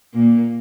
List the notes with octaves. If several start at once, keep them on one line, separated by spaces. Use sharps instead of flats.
A#2 A#3